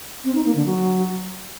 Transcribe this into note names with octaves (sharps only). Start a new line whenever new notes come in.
C4
D#4
A#3
D3
F#3